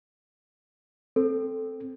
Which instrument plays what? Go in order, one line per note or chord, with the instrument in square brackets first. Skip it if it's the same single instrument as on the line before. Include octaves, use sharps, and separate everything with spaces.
[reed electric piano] C4 [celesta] A4